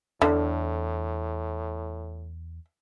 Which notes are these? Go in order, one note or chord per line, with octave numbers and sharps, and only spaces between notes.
E2 A2 D3